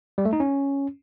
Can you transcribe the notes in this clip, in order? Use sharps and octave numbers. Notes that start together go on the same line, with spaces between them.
G3
A3
D#4
C#4